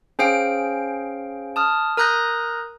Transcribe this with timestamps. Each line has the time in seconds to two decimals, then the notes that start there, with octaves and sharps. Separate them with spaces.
0.19 C#4 G#4 C5 F5 G5 D7
1.56 A5 D#6 F6
1.97 A#4 A#5 D#6 F#6 G6 A#6